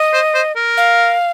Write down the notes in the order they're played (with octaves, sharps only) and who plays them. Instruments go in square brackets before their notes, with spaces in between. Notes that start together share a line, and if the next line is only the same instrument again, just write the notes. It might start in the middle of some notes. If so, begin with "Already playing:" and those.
Already playing: [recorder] D#5
[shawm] C5
C5
A#4
[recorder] F5